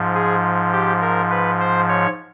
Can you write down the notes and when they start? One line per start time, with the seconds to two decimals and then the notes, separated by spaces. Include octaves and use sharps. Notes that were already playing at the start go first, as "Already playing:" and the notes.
Already playing: G#2 F3
0.15 G#4
0.73 G4
1.01 A#4
1.31 B4
1.60 C5
1.89 C#5